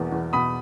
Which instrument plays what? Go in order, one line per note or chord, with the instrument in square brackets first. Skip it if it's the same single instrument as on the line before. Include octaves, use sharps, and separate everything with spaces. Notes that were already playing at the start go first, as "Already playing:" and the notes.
Already playing: [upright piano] E2 B2 A#3
E2
[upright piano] B2 [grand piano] B5 D#6